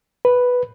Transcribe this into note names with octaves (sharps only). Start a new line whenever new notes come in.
B4